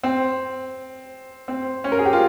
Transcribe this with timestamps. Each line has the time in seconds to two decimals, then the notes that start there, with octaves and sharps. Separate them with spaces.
0.03 C4
1.48 C4
1.84 C#4
1.92 A#4
1.99 G#4
2.05 G4
2.13 F4